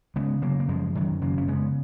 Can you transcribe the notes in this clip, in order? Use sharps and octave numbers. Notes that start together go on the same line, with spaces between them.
C#3 G#3 B3
C#3 F#3 A#3
A#3
F#2 F3 G#3
F#2 D#3 F#3
C#3 F#3 A#3
C#4
C#3 G#3 B3